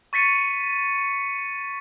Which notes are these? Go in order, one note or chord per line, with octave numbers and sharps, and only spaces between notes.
C#6 A6 B6 C#7 D#7